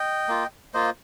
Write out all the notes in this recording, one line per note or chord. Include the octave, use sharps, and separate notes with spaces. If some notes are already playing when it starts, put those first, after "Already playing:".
Already playing: D#5 G5
A#3 F4
A#3 F4 C5 D#5